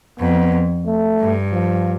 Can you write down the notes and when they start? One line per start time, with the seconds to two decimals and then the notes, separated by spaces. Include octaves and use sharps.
0.19 F2 B3
0.86 A3
1.20 G2
1.52 F3